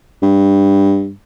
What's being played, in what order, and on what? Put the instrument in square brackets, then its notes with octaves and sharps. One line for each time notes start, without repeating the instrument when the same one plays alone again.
[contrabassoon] G2